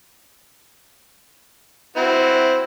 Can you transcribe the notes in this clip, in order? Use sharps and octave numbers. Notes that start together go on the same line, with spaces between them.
C4 E4 F#4